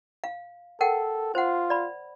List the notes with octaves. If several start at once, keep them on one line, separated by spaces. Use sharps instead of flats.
F5
A4 A#4 F#5 G5
F4 C5 F#5
D5 B5